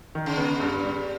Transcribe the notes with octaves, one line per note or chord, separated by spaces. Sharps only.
D#3
C#3
B3
G2
G3